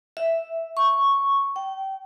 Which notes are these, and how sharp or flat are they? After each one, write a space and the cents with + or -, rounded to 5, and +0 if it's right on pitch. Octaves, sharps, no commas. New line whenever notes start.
E5 +0
C#6 +0
G5 -30